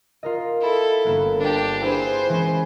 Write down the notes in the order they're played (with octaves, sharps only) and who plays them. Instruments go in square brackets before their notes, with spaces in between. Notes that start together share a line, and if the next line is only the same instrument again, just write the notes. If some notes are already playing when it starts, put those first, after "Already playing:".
[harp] F4 A#4 D#5
[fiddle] E4 A4
[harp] G1 A#3 B3
[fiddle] D4 G4
[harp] E4 G#4 [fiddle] B4 C5
[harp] E3 G#3 C#4